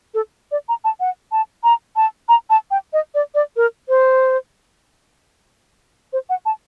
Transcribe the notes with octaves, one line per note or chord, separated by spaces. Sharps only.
A4
D5
A#5
A5
F#5
A5
A#5
A5
A#5
A5
G5
D#5
D5
D5
A#4
C5
C5
F#5
A5